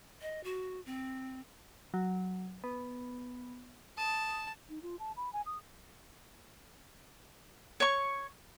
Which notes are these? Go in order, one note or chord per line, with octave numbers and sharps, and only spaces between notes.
D#5
F#4
C4
F#3
B3
A5 D#6
D#4
F4
A5
B5
G#5
D#6
C#5 C#6